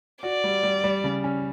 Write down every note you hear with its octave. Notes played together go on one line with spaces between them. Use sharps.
F#4 D5
G3
G3
G3
C#3
C#4